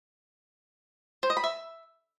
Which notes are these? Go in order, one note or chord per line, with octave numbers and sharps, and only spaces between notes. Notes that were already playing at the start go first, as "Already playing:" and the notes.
C5
D#5
B5
E5